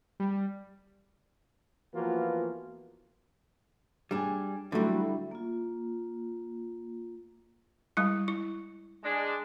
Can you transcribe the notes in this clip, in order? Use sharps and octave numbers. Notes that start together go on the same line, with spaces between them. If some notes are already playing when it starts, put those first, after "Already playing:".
G3
E3 F3 A#3 B3 F4 F#4
G3 D4 G#4 G#5
D3 F#3 G3 A3 E4 F#4
A#3 F4
G3 G#3 E4
E4
G#3 D4